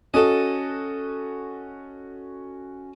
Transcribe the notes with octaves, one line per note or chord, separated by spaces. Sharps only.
C#4 F#4 A4 D#5